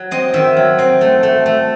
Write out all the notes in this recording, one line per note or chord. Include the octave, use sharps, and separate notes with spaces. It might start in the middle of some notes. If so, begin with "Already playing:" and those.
Already playing: F#3
C4 D#5
D#3 E5
F#3
C4
A3
A3
A3